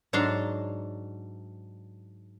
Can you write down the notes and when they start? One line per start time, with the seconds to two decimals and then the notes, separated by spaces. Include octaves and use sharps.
0.13 G#2 F#3 D4 A5 A#5 C6